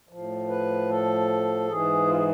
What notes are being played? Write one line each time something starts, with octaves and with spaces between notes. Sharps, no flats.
A2 F3
B4
A4
G#2 E3 G#4
F4
G#4